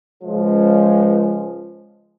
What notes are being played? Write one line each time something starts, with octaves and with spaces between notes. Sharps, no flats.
C#2 C#3 F3 G#3